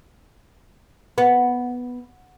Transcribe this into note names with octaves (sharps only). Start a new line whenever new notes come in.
B3